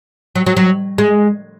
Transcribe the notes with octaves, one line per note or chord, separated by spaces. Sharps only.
F#3
F#3
F#3
G#3